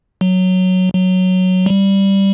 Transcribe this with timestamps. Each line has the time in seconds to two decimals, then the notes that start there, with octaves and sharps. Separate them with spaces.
0.21 F#3
0.94 F#3
1.66 G3